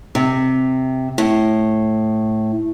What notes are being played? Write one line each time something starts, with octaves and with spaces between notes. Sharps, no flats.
C3
A2